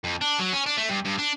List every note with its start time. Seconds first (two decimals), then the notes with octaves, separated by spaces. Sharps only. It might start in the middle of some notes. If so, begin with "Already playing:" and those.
0.04 F2
0.21 D4
0.39 F#3
0.53 C#4
0.66 D4
0.77 A3
0.89 G2
1.05 G2
1.19 D4